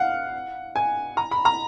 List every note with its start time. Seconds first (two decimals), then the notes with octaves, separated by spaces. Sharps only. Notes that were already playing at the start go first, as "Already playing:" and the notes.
Already playing: F5 F#5
0.76 G#5
1.17 A#5
1.31 B5
1.45 A#5